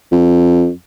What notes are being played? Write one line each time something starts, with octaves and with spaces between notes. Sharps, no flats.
F2